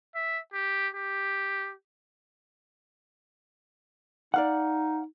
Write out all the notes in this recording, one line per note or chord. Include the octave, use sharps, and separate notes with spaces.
E5
G4
G4
D#4 D5 F5 F#5